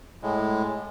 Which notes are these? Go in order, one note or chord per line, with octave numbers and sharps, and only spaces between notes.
A2 G#3